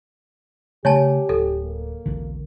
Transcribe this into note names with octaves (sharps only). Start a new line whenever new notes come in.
C#3 A3 G4 C#5 G#5 A5
D1 A4
A#3
E1 B1 D3